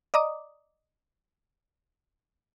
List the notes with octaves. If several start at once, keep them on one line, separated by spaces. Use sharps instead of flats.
D5 D#5 A#5 D6 D#6